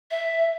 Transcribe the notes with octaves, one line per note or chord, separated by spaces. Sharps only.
E5